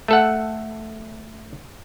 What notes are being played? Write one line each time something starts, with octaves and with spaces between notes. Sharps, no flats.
A3 A4 F#5